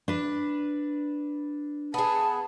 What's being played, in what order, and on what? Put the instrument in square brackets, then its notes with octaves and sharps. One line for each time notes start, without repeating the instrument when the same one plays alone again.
[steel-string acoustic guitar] D4 B4
[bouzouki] B3 G#4 [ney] A5